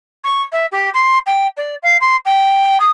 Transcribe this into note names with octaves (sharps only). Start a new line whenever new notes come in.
C#6
E5
G4
C6
G5
D5
F5
C6
G5
D#6